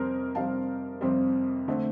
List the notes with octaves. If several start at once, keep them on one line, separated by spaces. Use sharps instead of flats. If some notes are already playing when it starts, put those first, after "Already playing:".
Already playing: F2 C3 G3 C4 A#4 C5
F2 C3 G3 C4 F5 A5
F2 C3 G3 C4
D3 A3 C4